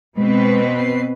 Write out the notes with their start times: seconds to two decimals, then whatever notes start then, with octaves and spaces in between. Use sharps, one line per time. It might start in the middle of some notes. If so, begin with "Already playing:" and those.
0.17 B2 G#3 C4 B4
0.78 C7